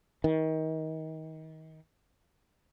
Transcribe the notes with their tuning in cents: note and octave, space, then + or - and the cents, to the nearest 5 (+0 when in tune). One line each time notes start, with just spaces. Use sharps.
D#3 +30